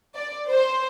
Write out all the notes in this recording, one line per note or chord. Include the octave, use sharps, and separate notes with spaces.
D5
C5